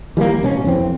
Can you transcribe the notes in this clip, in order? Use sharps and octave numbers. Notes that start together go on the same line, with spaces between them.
E3 G3 G#3 A#3
A1 B2 C4 C#4
F2 E3 C4